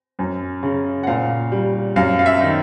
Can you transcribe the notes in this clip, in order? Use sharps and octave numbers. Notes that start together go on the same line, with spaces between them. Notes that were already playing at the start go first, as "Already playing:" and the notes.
F#2
C#3
F#5
A#2 F5
G3
F#2 F5
F5
E5
D#3